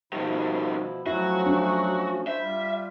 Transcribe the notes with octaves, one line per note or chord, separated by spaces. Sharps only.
B2 D#3 F3 G3 E4
F3 F#3 A3 C#4 E4 F#4
D4
E4 C5 E5
G3 F4